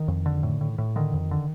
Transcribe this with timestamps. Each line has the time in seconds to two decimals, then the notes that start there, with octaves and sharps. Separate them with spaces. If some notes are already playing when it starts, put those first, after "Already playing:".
Already playing: D#3
0.08 F2
0.26 D3
0.43 A2
0.61 A2
0.78 A2
0.96 D3 D#3
1.14 F2
1.31 D3